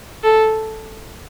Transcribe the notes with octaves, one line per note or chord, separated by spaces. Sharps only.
A4